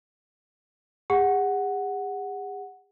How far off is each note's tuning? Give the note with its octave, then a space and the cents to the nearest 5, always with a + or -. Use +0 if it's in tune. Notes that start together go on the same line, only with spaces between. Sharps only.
G#4 -45 F#5 +0